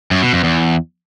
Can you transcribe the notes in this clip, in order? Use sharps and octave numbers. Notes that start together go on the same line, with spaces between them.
F#2
B2
F2
E2